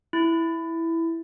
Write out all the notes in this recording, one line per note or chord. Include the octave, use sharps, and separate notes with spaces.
E4